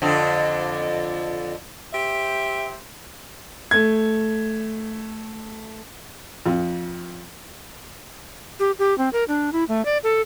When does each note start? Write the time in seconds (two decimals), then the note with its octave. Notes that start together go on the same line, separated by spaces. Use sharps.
0.02 F2 D3 C4
1.93 G4 C5 E5
3.71 A3 G#6
6.46 F2
8.60 G4
8.79 G4
8.98 C4
9.13 A#4
9.28 D4
9.53 E4
9.69 A3
9.85 D5
10.04 A4